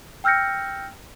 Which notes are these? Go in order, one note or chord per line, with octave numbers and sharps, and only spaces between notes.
G5 E6 F6 G6 A#6 C#7